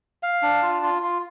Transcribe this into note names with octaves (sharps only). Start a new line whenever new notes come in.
F5
D4
F4
F4
F4